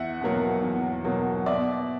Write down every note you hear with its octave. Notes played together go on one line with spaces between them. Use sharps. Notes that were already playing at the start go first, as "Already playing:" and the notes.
Already playing: E2 E5 F#5
B2 F#3 A#3
E2
B2 F#3 A#3
B2 D5 E5